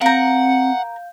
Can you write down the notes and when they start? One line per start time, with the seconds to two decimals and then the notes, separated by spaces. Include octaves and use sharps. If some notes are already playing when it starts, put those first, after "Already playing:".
0.01 C4 A#4 F5 F#5 A#5 G6